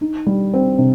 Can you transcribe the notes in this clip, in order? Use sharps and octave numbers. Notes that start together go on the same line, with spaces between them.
D#4
G3
C4
C3